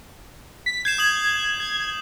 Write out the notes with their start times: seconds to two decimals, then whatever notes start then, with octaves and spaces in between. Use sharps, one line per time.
0.66 B6
0.85 G6 G#6 C7 E7
0.98 D#6 F#7
1.60 G#6